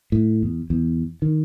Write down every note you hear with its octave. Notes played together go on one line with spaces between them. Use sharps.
A2
E2
E2
D#3